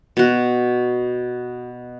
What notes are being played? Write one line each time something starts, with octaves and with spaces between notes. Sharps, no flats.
B2 F#4